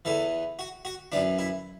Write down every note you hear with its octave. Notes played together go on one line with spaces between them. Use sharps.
E2 E3 A4
F#4
F#4
F#2 E3 D4
E4